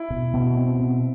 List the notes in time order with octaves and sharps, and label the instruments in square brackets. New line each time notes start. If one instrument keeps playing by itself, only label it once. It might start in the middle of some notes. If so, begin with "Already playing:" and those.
Already playing: [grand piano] E4
[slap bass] B2
B2
C4
B2